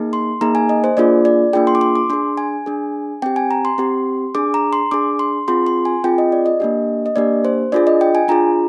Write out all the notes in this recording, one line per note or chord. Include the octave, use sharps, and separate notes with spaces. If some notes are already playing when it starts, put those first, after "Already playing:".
Already playing: A#3 D#4 G#4
C6
A#3 D#4 G#4 A#5
G#5
D#5
C5
A#3 D4 F4 G#4 D5
D5
A#3 D4 F4 G#4 G5
C6
D6
C6
D6
D4 G#4 C6
G#5
D4 G#4
C4 G4 G5
G#5
A#5
C6
C4 G4
D4 G#4 D6
A#5
C6
D4 G#4 D6
C6
C4 F4 G#4 C6
C6
G#5
C4 F4 G#4 G5
D#5
D5
D#5
A#3 D4 G4
D#5
A#3 D4 G4 D5
C5
D4 F4 G#4 D5
D#5
G5
G#5
D4 F4 G#4 A#5